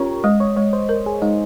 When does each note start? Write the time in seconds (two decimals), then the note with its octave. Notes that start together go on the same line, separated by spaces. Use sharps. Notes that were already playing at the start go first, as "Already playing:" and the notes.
Already playing: C#4 F4 G4 A#4 C#5
0.24 G#3 D#5
0.40 C#5
0.56 G#3 C#5
0.73 C5
0.89 A#4
1.06 G#4
1.22 G#3 D#4